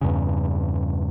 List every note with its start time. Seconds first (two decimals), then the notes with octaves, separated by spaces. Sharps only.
0.01 E2 G2 C#3